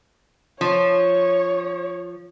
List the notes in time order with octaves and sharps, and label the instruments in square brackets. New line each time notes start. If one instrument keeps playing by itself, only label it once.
[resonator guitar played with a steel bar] F3 [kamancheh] C#5